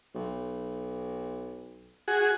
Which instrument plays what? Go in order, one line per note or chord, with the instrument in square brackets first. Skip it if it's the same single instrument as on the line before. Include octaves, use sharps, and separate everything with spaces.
[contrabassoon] B1
[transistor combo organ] F#4 G#4